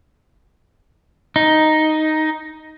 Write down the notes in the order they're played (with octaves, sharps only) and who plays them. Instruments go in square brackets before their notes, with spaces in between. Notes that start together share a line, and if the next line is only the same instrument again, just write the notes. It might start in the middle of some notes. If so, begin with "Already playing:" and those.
[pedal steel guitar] D#4